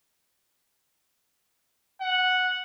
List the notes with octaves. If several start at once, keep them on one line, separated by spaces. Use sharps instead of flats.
F#5